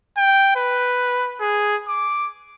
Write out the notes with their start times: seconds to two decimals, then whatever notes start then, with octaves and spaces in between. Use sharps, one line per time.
0.17 G5
0.56 B4
1.40 G#4
1.88 D6